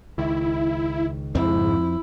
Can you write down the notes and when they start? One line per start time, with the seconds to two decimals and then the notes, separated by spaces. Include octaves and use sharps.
0.18 C#2 D#3 E4
1.35 F2 G#2 F3 C4 E4